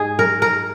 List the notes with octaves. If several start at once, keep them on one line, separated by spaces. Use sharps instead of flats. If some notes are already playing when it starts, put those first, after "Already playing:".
Already playing: G#2 G#3 G#4
A#4
A#4